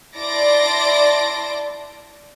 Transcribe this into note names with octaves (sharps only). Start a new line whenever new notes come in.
E4 D5 A5 C6 A#6 D7